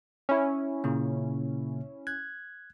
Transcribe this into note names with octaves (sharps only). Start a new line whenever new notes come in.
C#4 E4
A#2 C#3 A#3
F#6 G#6